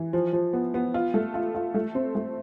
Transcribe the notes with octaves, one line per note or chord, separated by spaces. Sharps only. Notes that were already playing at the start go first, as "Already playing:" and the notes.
Already playing: E3
F3
F3
B3
B3
F4
A3
F4
F4
A3
C4
A3